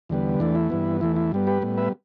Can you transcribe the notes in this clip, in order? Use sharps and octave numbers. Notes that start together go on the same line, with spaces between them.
E2 D3 G3 B3
E2 E3 A3 D4
E4
G2 E3 B3
E2 E3 A3 E4
E4
G2 G3 B3
G4 B4
A2 G3 B3
B4 E5